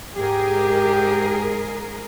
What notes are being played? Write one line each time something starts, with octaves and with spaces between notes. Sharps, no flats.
G#2 G4 G#4 A#4